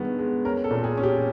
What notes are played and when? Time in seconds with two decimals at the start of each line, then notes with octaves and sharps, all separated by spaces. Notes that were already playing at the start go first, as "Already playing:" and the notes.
Already playing: G2 D#3 G#3 B3
0.19 G#3
0.45 C#4 A#4
0.64 A4
0.71 A#2
0.84 G#4
0.97 C#4
1.03 G4